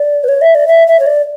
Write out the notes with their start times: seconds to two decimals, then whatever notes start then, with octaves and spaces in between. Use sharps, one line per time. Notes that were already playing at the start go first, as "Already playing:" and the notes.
Already playing: D5
0.24 B4
0.28 C#5
0.42 E5
0.55 D5
0.68 E5
0.87 E5
1.00 C#5
1.06 D5